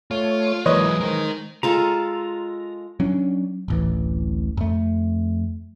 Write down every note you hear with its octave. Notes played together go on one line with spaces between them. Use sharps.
A3 F4 C#5
E3 F#3 G#3 A#3 E4 B4 C#5 D#5
D#4 A#4 C5
G#3 F4 A4 A#5
F#3 C#4 D4
D1 A1 E3
F2 A3